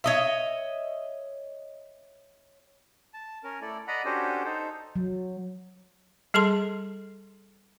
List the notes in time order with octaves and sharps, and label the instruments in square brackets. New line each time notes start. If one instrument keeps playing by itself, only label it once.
[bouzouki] C#5 D#5 E5
[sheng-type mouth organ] A5
C#4 A#4
A3 E4 A4 D5
D5 D#5 F#5 A#5 B5
C#4 D4 F#4 G4 A4 C5
D#4 A4 C5
[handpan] F#3
[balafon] G3 G#4 A4 A5 C6